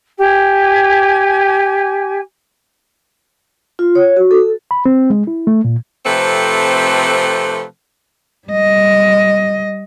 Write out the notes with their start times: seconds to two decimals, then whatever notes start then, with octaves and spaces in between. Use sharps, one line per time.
0.18 G4 G#5
3.79 F4
3.95 C#5
4.17 F#4
4.31 A4
4.71 B5
4.85 C4
5.10 G#3
5.27 E4
5.47 A3
5.65 A#2
6.05 C3 F3 A3 C4 A4 B4
8.48 G3 D#5